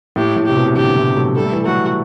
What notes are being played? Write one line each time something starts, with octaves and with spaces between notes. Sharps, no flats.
A2 G4
A2
C3 G4
B2
B2 D3 G4
B2
A2 C3
F#3 A3
G3 A4
A3
E3 G3
F#3 A3 F#4